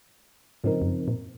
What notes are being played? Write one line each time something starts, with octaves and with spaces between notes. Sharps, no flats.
G#2 C#3 F3 C4 D#4 A#4
F2
F#2
A#2